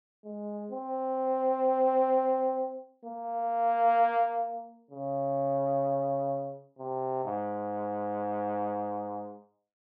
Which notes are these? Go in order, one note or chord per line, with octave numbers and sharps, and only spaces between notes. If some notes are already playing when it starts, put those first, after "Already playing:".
G#3
C4
A#3
C#3
C3
G#2